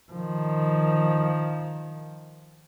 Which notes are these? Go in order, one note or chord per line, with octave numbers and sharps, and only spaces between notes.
D#3 F3